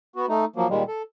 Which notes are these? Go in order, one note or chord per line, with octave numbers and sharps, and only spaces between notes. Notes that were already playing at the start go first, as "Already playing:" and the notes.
B3 F#4
A3 D#4
F3 F#3 A#3
A#2 D#3 G3 G#3
A4